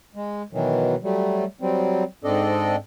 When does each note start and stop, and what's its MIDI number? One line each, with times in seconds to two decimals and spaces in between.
0.15 0.42 56
0.53 0.95 47
0.53 0.95 51
0.53 0.95 52
0.53 0.95 54
1.03 1.44 54
1.03 1.44 55
1.03 1.44 57
1.61 2.04 54
1.61 2.04 55
1.61 2.04 60
2.24 2.76 44
2.24 2.76 60
2.24 2.76 62
2.24 2.76 69
2.24 2.76 74
2.24 2.76 75